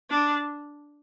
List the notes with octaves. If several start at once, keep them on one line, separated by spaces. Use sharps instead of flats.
D4